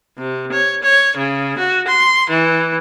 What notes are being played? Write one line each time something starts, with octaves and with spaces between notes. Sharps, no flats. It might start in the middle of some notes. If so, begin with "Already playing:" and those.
C3
C#5
C#5
C#3
F#4
C6
E3